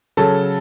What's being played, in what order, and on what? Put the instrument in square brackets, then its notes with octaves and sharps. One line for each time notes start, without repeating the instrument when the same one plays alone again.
[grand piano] C#3 F#3 A4